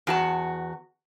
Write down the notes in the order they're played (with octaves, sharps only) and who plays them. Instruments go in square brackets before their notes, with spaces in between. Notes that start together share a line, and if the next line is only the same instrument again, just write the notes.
[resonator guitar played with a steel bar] E2 F#4 A5